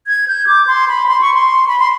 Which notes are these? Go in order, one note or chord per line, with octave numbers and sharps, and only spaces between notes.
G#6
G6
D6
C6
B5
C6
C#6
C6
B5
C6